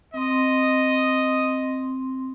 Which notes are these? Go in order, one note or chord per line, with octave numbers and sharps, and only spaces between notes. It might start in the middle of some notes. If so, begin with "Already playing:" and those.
C4 D#5 C6